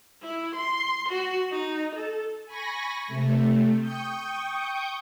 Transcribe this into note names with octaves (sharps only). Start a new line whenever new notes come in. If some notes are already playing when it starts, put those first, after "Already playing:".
E4
C6
F#4
D#4
A4
G#5 B5 C#6 A#6
C3 A3
G5 C#6 D#6 G6